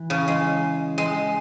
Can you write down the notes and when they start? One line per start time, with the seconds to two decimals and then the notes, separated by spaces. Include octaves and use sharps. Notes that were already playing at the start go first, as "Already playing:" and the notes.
Already playing: E3
0.10 C#3
0.28 G#3
0.98 G#3